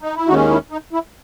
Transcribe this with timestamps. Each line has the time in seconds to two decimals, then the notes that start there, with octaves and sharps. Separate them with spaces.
0.02 D#4
0.16 E4
0.28 D#2 D#3 G#3 C#4 D#4 F#4
0.50 E4
0.71 D#4
0.93 E4